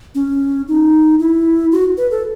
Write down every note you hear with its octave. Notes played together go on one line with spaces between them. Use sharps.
C#4
D#4
E4
F#4
B4
A4